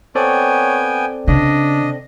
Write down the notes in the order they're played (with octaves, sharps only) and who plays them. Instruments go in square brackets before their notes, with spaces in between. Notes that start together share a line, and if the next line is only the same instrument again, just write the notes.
[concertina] B3 G5 G#5 [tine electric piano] C4 A4 D5 [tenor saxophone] C#5
[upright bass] C#3 [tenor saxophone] D4 [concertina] D#5